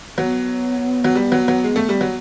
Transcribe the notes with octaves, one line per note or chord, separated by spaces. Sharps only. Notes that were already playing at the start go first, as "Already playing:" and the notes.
F#3 B3
F#3
G3
F#3
F#3
G#3
A3
G3
F#3